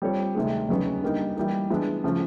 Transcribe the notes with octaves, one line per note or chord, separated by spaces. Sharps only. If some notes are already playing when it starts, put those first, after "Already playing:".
G3 C4 F4 A4 C#5
D2 C3 D#3 G#3
E2 C#3 F#3 B3 D#4
D3 G3 A#3 D#4
E3 G3 A#3 D#4
E3 G#3 B3 D4
C#3 F3 A3